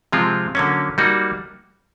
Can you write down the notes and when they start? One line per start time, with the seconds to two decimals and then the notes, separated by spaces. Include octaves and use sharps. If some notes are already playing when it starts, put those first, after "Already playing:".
0.12 C3 F3 G#3 C4 F4
0.55 D3 F#3 A#3 C#4
0.98 G3 A#3 D#4 F#4